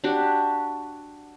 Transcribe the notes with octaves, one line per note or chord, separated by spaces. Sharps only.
D4 F#4 G4